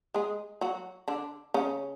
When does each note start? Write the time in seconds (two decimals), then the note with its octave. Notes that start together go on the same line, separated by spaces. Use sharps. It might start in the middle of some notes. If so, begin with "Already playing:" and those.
0.14 G#3 G#4
0.61 F#3 F#4
1.08 D3 D4
1.54 C#3 C#4